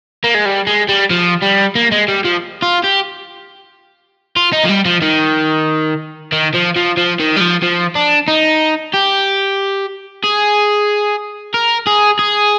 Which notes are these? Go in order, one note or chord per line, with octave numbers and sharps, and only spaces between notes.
A#3
G#3
G3
G#3
G3
F3
G3
A#3
G#3
G3
F3
F4
G4
F4
D#4
F3
G3
F3
D#3
D#3
F3
F3
F3
D#3
G3
F3
F3
D4
D#4
G4
G#4
A#4
G#4
G#4